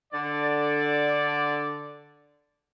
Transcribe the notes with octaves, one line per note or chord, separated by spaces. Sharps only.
D3 D5